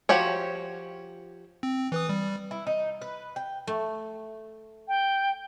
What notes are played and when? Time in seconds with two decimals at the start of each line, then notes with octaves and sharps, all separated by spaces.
0.09 F3 F#4 G4 C#5
1.63 C4
1.92 E3 B4 D#6
2.09 G3
2.51 E4
2.67 D#4
3.01 B4
3.36 G5
3.67 A3
4.88 G5